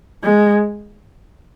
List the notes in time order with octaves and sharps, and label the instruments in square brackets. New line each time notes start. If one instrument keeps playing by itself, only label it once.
[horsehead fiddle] G#3